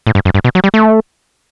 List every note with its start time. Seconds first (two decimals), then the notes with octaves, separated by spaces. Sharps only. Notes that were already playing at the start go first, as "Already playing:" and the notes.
0.07 A2
0.15 G2
0.25 F#2
0.34 G2
0.44 B2
0.55 F#3
0.64 G3
0.74 A3